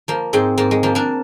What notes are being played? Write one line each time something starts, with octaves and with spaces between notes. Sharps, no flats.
F3 A#3
G#2 G#3 C4
G#2 A#3
G#3
F3 A#3
A#3 D4